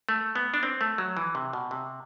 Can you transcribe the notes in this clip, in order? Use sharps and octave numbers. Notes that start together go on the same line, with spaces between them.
A3
B3
D4
C4
A3
F#3
E3
C3
B2
C3